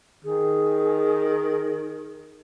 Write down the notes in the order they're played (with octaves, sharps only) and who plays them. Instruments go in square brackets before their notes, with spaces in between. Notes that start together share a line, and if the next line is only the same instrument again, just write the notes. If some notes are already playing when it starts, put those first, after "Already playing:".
[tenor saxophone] D#3 [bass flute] G#4